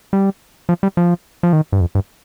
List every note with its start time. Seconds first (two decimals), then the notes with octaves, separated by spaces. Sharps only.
0.13 G3
0.69 F3
0.83 G3
0.97 F3
1.43 F3
1.53 D#3
1.72 G2
1.81 F2
1.95 G2